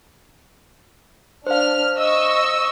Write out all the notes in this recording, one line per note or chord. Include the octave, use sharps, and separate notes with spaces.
D4 C5 F5 F6
D#5 C#6 E6